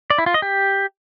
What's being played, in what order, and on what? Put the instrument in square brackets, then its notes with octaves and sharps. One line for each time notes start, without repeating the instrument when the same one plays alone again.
[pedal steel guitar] D5
E4
F4
D#5
G4